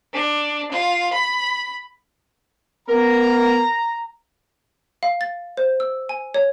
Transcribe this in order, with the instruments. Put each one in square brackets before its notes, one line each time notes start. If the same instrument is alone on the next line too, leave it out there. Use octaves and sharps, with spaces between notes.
[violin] D4
F4
B5
[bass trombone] B3 [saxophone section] A#4 [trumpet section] A#5
[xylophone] F5
A6
C5
E6
G#5
C#5